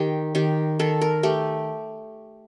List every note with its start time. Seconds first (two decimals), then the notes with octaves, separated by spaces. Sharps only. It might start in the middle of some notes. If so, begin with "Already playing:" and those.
Already playing: D#3 G4
0.35 D#3 G4
0.79 D#3 A4
1.01 A#4
1.23 A3 G4